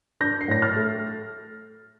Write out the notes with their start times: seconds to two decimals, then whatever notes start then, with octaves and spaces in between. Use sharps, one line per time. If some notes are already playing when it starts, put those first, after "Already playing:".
0.20 D4 G6 A#6
0.41 C7
0.48 A2 A#6
0.62 F6 A6
0.76 A3